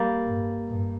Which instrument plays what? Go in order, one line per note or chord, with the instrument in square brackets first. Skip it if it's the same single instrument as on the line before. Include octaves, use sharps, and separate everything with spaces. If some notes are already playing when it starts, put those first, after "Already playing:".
Already playing: [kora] G3 A#3
[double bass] G2
G2